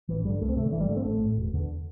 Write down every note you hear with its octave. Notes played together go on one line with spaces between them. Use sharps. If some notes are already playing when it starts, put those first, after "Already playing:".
A1 E3
G2 D3 G3
C2 A3
C4
C3 A3
D3
G1 E3
G3
G2 D3 A3
C4
A1 A3
A2
E1
E2 D3